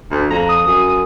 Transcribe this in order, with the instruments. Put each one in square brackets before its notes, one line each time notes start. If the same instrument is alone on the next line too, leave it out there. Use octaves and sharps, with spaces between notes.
[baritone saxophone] D2
[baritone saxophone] F2 [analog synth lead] A#5
[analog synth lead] D#6
[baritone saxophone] F#2